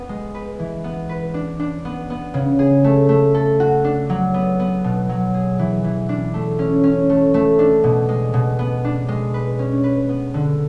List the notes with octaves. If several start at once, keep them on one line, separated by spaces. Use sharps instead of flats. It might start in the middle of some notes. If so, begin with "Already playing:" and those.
Already playing: B3
G#3
B4
E3
B3
B4
D4
D4
B3
B3
C#3
G#4
A3
A3
A4
F#4
D4
F#3
B3
B3
B2
F#3
G#4
E3
E3
D4
A3
C#4
C#4
A3
A3
D4
B2
G#3
B2
B3
D4
G#3
B4
C#4
B4
B3
D3